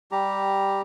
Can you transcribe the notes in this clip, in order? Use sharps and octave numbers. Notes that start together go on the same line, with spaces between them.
G3 G4 A#5